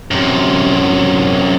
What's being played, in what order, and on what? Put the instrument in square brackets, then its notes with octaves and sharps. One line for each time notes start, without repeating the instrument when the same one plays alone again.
[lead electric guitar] F#2 C3